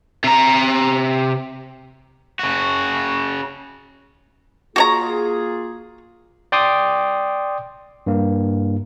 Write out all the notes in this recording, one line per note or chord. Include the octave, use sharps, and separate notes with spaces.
C3 A#5
C#3 F#4
A#3 F4 F#4 G#4 C#5 A#5
D5 G5 C6 D6 D#6
G2 A#3